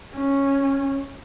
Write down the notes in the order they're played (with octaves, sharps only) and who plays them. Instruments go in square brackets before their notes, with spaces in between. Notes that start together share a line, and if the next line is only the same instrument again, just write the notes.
[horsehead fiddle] C#4